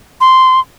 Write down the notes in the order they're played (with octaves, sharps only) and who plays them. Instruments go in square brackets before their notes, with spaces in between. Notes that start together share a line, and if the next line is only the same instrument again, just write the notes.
[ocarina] C6